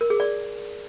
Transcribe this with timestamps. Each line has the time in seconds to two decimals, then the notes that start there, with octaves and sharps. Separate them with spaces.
0.01 A#4
0.10 G#4
0.20 D5